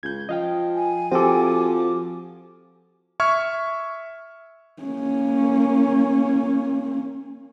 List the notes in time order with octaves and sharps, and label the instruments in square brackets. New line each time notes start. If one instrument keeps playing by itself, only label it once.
[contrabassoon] C#2 [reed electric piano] G6 G#6
[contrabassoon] F3 [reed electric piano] D#5 F5 G5
[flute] G#5
[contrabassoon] F3 [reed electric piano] C4 A4 [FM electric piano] F#4 G4 D6
[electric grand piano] E5 C#6 F6 G#6
[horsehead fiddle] A#3 C#4